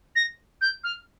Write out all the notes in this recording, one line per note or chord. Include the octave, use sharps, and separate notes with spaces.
A#6
G6
F6